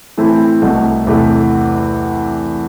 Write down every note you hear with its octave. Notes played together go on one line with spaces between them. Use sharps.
A2 E3 A3 C4 E4
C2 B2 A3
E2 C3 E3 A3